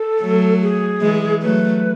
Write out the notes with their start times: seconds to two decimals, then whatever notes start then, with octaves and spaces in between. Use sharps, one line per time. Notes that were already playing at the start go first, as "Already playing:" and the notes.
Already playing: A4
0.21 F#3 A3
0.62 G#4
1.01 E3 G#3
1.42 F#3 A3 B4